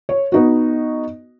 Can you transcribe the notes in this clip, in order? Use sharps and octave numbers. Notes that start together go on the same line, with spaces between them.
C#5
B3 D#4 F#4